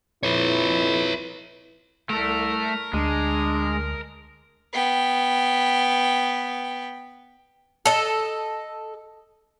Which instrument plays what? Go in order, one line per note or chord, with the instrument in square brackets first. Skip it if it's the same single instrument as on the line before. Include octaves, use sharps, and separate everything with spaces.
[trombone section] F2 E4 [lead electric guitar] B4 C#5
[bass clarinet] C2 [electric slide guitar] A3 A4 [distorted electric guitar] A#4
[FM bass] D2 [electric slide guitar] G#3 [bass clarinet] D4
[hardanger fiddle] B3 G5
[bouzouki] A4 D#5